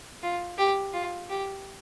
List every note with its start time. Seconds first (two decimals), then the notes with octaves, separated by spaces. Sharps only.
0.23 F4
0.58 G4
0.93 F4
1.29 G4